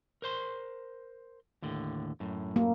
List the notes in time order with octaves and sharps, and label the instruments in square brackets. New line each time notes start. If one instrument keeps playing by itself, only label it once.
[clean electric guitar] A#4 C5 C6
D#2 A2 D3
F#2 A2
[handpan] A#3